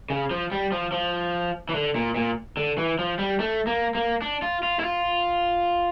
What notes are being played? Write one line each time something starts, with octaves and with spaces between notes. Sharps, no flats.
C#3
F3
G3
F3
F3
E3
D3
A#2
A#2
D3
E3
F3
G3
A3
A#3
A#3
D4
F4
F4
E4
F4